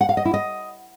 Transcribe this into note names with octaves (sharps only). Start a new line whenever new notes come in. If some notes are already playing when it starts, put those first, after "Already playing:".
F#5
F5
D#5
E4
D#5